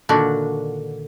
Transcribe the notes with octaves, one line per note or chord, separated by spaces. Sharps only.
A#2 D3 D#3 D4 F#4